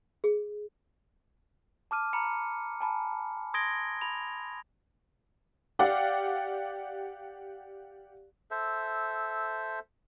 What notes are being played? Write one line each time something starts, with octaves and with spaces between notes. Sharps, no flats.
G#4
A5 D6 F6 D#7
A#5 B5 C#7
G#5 A5 B5
C6 D#6 G#6 A#6 D7 G7
B5 F7
G4 D5 F5 F#5
A4 C5 E5